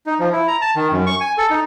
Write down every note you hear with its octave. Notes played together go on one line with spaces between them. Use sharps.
D#4
F3
E4
A#5
A5
D#3
F#2
C#6
G#5
A4
D#4